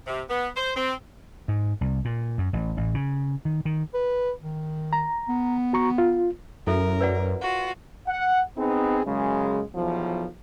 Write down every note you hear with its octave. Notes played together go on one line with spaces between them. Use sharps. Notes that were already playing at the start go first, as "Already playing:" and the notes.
C3
B3
C5
C4
G#2
C2
A#2
F#2
A1
A1
C#3
D#3
D#3
B4
D#3
A#5
B3
F#4 A#5 C#6
F4
F#2 E4 A4 A#4 E5
B4 D5 F#5
F4 F#4
F#5
B3 C4 D#4 G#4
F#2 C#3 G#3
B1 E2 F3